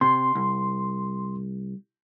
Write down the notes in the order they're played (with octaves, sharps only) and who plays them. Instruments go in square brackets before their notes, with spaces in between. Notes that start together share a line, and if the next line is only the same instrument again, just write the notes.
[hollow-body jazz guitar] C3 [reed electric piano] C6
[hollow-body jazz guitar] C2